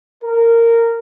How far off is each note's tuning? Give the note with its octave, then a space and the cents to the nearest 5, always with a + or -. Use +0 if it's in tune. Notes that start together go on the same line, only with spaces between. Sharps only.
A#4 -15